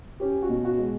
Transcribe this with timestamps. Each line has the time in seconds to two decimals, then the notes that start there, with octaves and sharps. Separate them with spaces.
0.20 C#4 G4
0.42 F#4
0.49 B2
0.65 F#4
0.78 G#3